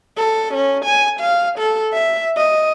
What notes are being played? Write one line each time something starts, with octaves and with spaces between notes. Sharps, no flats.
A4
C#4
G#5
F5
A4
E5
D#5